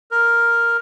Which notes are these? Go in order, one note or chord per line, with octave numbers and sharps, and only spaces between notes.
A#4